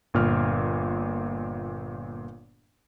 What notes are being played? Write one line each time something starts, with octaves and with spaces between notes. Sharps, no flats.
G1 A#2 F6